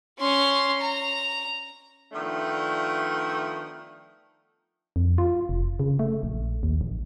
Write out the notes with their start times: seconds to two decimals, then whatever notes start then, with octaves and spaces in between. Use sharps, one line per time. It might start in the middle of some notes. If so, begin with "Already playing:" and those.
0.19 C#4 C6
0.80 A#5
2.12 D#3 F3 A3 B3 D4
4.96 F2
5.18 F4
5.49 F1
5.80 C#3
5.99 A3
6.23 A#1
6.63 D#2
6.81 A#1